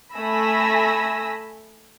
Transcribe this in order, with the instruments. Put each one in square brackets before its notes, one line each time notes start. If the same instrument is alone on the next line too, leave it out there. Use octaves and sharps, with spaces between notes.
[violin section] A3 G#5 B5 E6 A#6